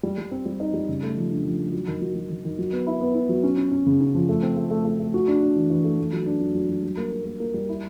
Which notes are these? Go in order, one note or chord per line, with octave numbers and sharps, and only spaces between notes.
G3
G3
C4
G3
D#4
G3
C#3
A3
F3
D4
F3
A3
F#3
D#3
F#3
F#3
D#3
D#3
F#3
B3
E4
B3
E4
F#3
C#4
C#4
C#4
C#3
C#4
F3
A3
C4
A3
A3
A3
A3
F#4
D4
D4
E3
E3
A3
A3
F#3
D4
F#3
F#3
F#3
G3
A#3
A#3
A#3
A#3
G3
E4